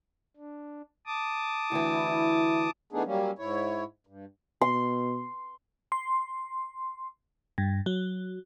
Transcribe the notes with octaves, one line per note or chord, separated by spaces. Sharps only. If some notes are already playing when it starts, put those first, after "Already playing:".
D4
A5 D6 D#6
D2 E3 E4
E3 A3 B3 D4 D#4 G#4
F#3 G3 A#3 C#4
G#2 E4 C#5
G2
B2 C6
C6
G2
F#3